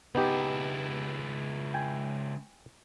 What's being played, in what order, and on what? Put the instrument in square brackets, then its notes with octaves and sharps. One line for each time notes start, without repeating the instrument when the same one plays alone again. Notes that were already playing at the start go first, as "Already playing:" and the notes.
[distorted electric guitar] C#2 E4 [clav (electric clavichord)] B3 D#4 G4
[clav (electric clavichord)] G5 G#5